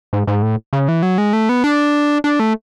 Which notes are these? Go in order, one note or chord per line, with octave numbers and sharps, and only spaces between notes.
G#2
G#2
A2
C#3
E3
F#3
G#3
A3
B3
D4
D4
A3